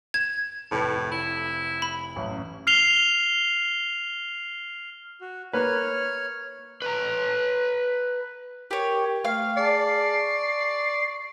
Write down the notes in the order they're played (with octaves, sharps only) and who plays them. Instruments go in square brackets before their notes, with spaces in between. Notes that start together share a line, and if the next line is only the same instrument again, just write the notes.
[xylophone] G#6 [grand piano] E7
[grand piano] F1 B4 G5 [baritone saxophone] A2
[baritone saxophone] E4
[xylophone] B5
[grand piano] A1 F#2
[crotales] F6 C7 F7 G7
[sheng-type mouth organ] F#4
[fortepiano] A#3 B4 [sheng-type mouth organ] C#5 F6
[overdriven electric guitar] B4 A#5
[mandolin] G4 C#5 [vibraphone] A#4
[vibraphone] A3 G5 [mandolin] F5
[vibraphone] G#4 G#5 A5 [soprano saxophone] D5 [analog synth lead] C7
[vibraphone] C#6